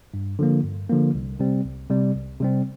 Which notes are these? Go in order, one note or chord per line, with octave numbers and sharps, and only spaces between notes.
G2
D3 F3 A#3
G2
D3 F3 A#3
C2
C3 G3 C4
C2
C3 G3 C4
C2
C3 G3 C4